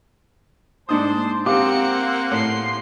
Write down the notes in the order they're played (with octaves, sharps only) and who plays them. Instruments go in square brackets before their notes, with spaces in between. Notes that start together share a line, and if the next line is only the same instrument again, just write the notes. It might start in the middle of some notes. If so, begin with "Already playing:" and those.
[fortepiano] G#2 D4 D#6 [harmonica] C5 A5 C6
[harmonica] A#3 C5 F#5 [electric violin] C4 C#7 [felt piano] G4 F5 D6
[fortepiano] A2 [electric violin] C6 C7